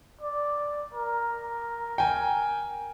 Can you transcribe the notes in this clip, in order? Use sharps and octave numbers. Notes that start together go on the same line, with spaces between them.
D5
A#4
G5 G#5